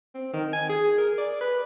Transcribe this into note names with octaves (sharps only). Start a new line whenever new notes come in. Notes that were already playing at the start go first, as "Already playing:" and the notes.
C4
D#3
G#5
G#4
A#4
D5
B4